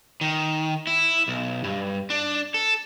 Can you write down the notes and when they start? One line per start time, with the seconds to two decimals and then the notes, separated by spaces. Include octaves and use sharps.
0.21 D#3
0.87 E4
1.28 B1
1.64 G2
2.10 D4
2.54 A4